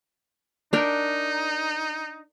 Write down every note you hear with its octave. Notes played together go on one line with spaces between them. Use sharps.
D4 D#4 A#4 G5